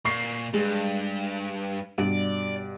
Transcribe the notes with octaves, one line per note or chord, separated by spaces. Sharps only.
A#2 C#6 C7
G2 G#3
G2 B2 D5